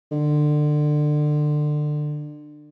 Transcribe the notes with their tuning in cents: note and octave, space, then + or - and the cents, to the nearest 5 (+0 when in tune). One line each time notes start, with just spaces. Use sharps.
D3 +25